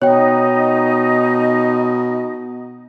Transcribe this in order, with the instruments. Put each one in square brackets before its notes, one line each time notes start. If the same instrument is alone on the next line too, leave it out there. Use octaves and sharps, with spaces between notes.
[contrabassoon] B2 [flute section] D#4 D#5 [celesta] C#5 G5